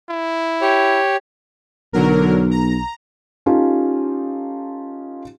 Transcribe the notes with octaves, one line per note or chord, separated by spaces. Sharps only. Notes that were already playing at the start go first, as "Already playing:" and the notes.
E4
G4 C#5
B1 D3 F#3 A#4
A#5
C#4 D#4 F4 G4 A4